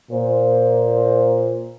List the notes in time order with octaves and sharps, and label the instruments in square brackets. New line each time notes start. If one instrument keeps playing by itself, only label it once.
[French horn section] A#2 C5